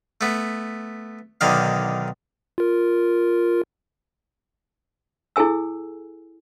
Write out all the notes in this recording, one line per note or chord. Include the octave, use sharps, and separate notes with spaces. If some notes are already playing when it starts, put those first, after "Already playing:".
A3 B3
B1 D3 D#3 F5
F4 A#4
E4 G#4 A4 G#5 E6